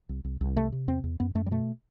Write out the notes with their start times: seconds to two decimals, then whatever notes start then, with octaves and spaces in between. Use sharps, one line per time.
0.09 C2
0.24 C2
0.41 C2
0.56 C3 A3
0.72 C3
0.88 E2 C4
1.04 E2
1.20 F#2 B3
1.35 F#2 A3
1.46 G3
1.51 B2 A3